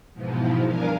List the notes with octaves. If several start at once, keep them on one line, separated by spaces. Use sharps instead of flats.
G#2 B2 E3 F3
G2 D4 A#4 F5 G#5